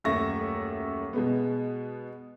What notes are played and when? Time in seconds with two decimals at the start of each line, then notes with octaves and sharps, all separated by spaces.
0.04 D#1 F#2 A3 E5 C#6 A#6
1.13 B2 G#3 B3